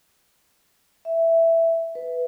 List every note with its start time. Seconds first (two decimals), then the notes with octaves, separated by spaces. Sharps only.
1.05 E5
1.95 B4